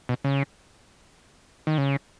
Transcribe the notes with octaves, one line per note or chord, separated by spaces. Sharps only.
B2
C#3
D#3
C#3